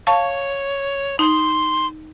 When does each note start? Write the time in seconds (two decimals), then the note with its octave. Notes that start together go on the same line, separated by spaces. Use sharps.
0.07 C#5 F5 A5 C#6
1.19 D#4 C6